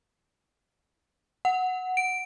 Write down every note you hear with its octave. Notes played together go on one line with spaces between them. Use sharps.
F#5
D7